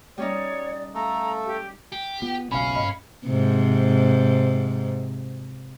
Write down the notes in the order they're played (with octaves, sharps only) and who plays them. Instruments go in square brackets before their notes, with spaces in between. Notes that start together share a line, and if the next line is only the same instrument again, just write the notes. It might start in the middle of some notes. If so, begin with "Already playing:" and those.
[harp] G3 C#4 D#4 [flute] C#5 [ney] D5
[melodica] A3 A4 [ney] F5 [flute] A#5
[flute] G4
[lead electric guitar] G4
[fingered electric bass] B3 [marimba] F4
[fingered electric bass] F#1 B1 B2 [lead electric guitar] C#4 [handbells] F5 B5
[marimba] G2 D#5 [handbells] B5
[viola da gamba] G#2 C3